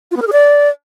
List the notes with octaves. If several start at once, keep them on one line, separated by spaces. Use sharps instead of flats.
F4
B3
A#4
G#4
D5